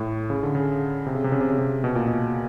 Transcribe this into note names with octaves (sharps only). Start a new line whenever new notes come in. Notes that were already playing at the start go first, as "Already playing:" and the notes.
Already playing: A2
C#3
D3
C#3
C3
C#3
C3
C#3
C3
C#3
C3
B2
A#2
B2